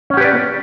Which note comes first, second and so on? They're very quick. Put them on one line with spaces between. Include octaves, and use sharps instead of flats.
C#4 F#5 G4 B4 D5